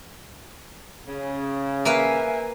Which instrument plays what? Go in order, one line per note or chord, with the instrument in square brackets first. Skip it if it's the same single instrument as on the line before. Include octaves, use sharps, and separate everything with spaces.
[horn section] C#3
[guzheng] A#3 B4 F5 [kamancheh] E5 G#5